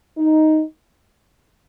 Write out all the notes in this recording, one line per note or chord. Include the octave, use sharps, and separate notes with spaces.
D#4